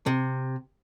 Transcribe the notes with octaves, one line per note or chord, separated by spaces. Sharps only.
C3